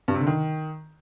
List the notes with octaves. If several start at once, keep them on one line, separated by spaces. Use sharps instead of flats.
G2
C3
D3
D#3